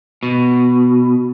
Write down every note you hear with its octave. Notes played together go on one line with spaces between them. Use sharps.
B2